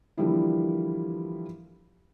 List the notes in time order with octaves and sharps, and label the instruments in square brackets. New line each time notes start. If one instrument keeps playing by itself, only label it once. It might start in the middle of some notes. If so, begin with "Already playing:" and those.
[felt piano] D3 E3 F3 G3 A#3 E4